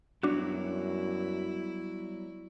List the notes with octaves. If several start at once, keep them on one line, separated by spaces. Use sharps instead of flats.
F#2 F#3 G3 B3 D4 E4 F#4